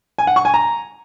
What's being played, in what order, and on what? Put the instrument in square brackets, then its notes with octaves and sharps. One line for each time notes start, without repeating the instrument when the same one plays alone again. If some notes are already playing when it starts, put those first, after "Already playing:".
[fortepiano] G#5
F#5
C#6
G#5
A#5